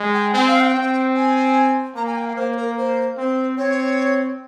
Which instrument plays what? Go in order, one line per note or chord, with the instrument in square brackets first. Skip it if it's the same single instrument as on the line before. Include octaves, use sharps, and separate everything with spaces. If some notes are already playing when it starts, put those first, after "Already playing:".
Already playing: [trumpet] G#3
[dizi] G5
[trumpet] C4 [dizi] G#5
[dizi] F5
G5
[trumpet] C4
[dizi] G#5
[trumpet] A#3 [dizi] A#5
[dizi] G#5
G5
F5
[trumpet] A#3 [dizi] C5
[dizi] C5
A#4
C5
[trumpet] C4 [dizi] C5
[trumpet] C4 [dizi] C#5